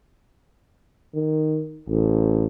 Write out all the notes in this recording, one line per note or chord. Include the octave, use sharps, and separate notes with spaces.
D#3
A1